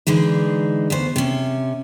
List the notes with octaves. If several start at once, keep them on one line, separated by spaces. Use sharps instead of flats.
D3 E3 G#3 D#4
D2 B3 C5
C3 C#4